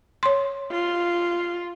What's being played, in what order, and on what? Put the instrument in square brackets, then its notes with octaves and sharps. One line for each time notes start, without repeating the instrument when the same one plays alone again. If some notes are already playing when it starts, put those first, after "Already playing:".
[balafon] C#5 C6
[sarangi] F4